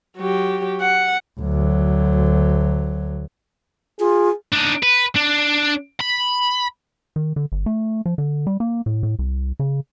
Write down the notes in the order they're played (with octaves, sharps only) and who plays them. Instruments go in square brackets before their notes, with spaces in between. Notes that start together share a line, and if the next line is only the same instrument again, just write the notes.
[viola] F#3 G4
F#5
[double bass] D2 F#3
[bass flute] F4 [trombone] G#4
[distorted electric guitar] D4 D#4
B4
D4
B5
[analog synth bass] D#3
D3
G1
A3
F3
D3
G3
A#3
A2
A2
C2
C#3